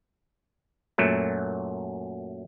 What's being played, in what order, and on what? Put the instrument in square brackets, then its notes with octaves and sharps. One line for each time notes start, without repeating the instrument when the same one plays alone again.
[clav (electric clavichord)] F#2 A#2 F#3 A3